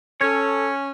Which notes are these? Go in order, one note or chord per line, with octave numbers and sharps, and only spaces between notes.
C#4 A4 C#5